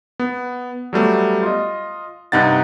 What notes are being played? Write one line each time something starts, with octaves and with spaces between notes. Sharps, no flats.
B3
F#3 G3 A3 B3
F4 D#5
G2 C3 D#4 F#5 A6